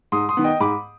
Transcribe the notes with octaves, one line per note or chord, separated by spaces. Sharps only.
G#2 C6 D#6
C6 D#6
D#3 B3
D#5 G5
G#2 B5 D6